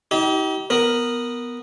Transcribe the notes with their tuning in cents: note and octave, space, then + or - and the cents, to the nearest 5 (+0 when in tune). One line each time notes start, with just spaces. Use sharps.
D#4 +40 G4 -30
B3 +0 A#4 +0